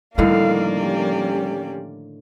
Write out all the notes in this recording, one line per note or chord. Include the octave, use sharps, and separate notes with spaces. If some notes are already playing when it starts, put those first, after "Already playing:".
A2 D3 D#3 F3 G3 A#3 D5 F5
C#4 G4